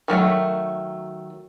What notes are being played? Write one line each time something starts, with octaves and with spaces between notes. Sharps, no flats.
D#3 F#3 G3 A3